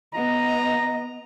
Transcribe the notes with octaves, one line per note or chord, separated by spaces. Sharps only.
B3 D#5 A#5